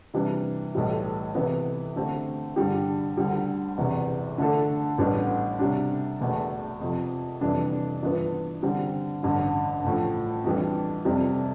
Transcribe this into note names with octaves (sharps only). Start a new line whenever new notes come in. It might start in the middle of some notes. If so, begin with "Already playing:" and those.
C3 E3 G3 D4
B1 A2 E3 G3
C3 E3 B3
D3 A3 C4 G4
G2 D3 G3 D4 G4
D2 D3 G3
E1 E2 C3 E3
D3 A3 D4 A4
A1 A2 G3 B3 D4
C3 G3 D4
E1 E2 B2 A3
F2 C3 F3
F1 F2 E3 G3 D4
G2 E3 B3 F4
D3 G3 C4
A1 G2 D3
A1 A2 F3
F2 E3 G3 D4 G4
F1 F2 C3 G3 C4